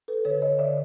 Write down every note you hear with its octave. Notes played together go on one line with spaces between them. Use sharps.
A4 B4
D3 B4 C#5
C#5 D#5
D3 D5 E5